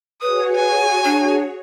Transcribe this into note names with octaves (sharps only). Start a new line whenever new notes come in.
F#4 G#4 B4 C#5 D#6
G#5
D4